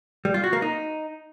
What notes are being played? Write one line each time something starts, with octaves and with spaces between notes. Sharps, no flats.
G3
F4
F#4
A#3
D#4